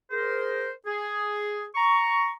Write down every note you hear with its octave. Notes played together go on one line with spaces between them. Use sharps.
G#4 A#4 C5
G#4
A#5 C#6